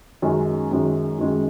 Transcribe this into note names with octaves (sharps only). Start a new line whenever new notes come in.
F#2 D#3 G#3 C#4
F#2 D#3 G#3 C#4
F#2 D#3 G#3 C#4